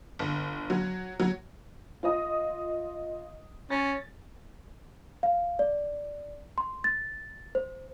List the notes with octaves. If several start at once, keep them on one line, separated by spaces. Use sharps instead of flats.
G1
F#3
F#3
F4 D#5 D#6
C#4 A6
F5
D5
C6
A6
C5